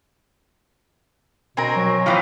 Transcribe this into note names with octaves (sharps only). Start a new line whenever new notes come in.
B2 C4 A#4 G#5 A#5
F#3
A#2 E3 F3 F5 G5